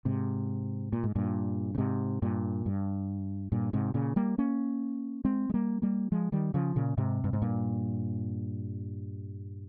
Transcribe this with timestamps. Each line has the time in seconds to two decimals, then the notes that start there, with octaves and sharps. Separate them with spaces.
0.05 G#2 C3
0.93 A#2
1.03 G#2
1.15 G2 A#2
1.75 C#3
1.78 G#2 C3
2.22 G2 A#2
2.66 G2
3.52 G2 A#2
3.73 G#2 C3
3.94 A#2 C#3
4.16 G3 A#3
4.38 A#3 C#4
5.25 G#3 C4
5.50 G#3
5.54 G3 A#3
5.82 G3 A#3
6.12 F3 G#3
6.32 D#3 G3
6.54 C#3 F3
6.76 A#2 C#3
6.98 G#2 C3
7.24 G2
7.33 G#2
7.42 G2 A#2